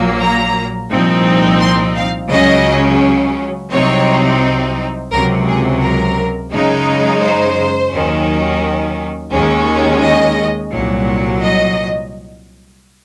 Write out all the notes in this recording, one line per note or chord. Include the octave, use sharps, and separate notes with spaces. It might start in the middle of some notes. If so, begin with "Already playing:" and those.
Already playing: A#1 A#2 F#3 A#3
A#5
C2 A#2 F3 C4 D#4
C6
F5
C#2 C#3 F#3 C#4 D#5
C2 C3 F#3 C4 D#4 C#5
C#2 C3 F#3 A#4
G#4
A#4
F#2 C#3 G#3 D#4
C5
D#2 D#3 F#3 C#4
D#2 D#3 G#3 C#4
D#5
C2 A#2 F#3
D#5